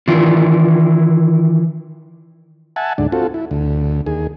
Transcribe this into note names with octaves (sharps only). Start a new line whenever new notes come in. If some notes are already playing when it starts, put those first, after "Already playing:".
D#3 E3 D4 E4 F4
E5 F#5 G#5 A5
D2 G#2 D4
C4 F4 F#4 A4
E4
D2
D#2 G#4